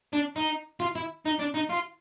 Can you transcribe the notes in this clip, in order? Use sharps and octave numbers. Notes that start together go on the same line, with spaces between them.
D4
D#4
F4
E4
D#4
D4
D#4
F4